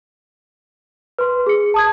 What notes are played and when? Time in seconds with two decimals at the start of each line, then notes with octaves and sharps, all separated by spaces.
1.19 B4 C6
1.46 G#4 C#7
1.74 A5 D#6 G#6